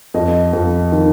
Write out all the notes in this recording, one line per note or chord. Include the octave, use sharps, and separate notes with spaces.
F2 D#5
F2
D#3